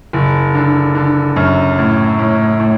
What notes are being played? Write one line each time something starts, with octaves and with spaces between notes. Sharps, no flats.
F#1
D3
D3
F#2
A2
A2
A2